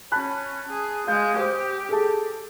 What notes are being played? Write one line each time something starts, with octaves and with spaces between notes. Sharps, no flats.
C#4 A5 B5 F#6
G#4
G#3 F5 G6
G4 C5 D#6
G#4 A4 A5